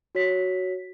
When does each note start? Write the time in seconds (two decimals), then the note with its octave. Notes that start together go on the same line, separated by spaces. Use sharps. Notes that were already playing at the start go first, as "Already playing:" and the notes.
0.15 F#4 C#5 B6